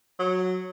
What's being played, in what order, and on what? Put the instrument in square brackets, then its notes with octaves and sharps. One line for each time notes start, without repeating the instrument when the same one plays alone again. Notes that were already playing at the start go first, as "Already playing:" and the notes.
[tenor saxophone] F#3